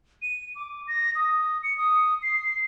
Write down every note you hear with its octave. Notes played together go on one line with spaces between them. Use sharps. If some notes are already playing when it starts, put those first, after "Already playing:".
D#7
D6
A#6
D#6
C#7
D#6
C7